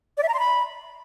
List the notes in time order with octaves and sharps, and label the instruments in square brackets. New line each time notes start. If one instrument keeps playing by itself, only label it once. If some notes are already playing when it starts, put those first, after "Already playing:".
[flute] D5
E5
A#5
C6
B5